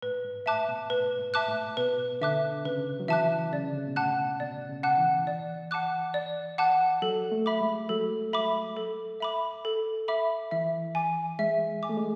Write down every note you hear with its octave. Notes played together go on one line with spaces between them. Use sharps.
A2 B4
G#2
A2 E5 A5 D6 F#6
B2
A2 B4
G#2
E5 A5 D6 F#6
A2
B2 B4
D3 E5 A5 D6 F#6
C#3 B4
F#3
E3 E5 A5 D6 F#6
C#3 D5
D3
C#3
B2
A2 F#5 A5 D6 F#6
B2 D5
C#3
F#5 A5 D6 F#6
E3
D5
F#5 A5 D6 F#6
D5
F#5 A5 D6 F#6
F#3 A4
A3
E5 B5 D6
G#3
F#3 A4
E5 B5 D6
A4
E5 B5 D6
A4
E5 B5 D6
E3 E5
G#5 D6
G#3 E5
G#5 D6
A3
G#3